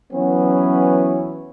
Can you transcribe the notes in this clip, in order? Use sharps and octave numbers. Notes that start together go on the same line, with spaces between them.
E3 F#3 B3 C#4